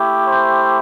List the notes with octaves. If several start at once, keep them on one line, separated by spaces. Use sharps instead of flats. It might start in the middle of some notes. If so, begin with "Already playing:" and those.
Already playing: A3 E4 G4
C5